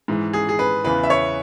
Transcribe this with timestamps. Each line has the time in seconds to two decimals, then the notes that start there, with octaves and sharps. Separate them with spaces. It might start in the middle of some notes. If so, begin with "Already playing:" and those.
0.08 G#2 E3
0.33 G#4
0.49 G#4
0.59 B4
0.85 E2 C#3 E3 B4
1.03 E5
1.10 C#5